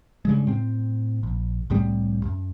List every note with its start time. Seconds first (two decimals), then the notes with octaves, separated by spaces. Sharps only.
0.25 G2 C#3 G#3
0.48 A2 C4
1.23 A#1
1.70 C2 A2 G3 C4
2.24 F#2